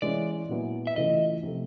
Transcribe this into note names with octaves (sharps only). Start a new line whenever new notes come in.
E3 G#3 C#4 D5
A#2 F#3 B3 E4
E5
C#3 E3 A3 C#4 F4 D#5
C3 F3 A3